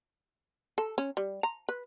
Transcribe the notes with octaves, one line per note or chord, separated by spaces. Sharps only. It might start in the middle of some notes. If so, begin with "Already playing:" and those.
A4
C#4
G3
A#5
B4